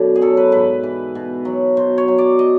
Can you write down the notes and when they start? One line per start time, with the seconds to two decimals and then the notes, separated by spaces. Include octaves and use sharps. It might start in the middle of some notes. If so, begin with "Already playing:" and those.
Already playing: F#2 B2 D3
0.16 G#4
0.21 F#3 A4
0.37 B4
0.52 G#2 B4
0.83 E3
1.15 B2
1.45 F#3
1.77 B2 C5
1.98 C#5
2.08 F#3
2.18 D5
2.39 D#5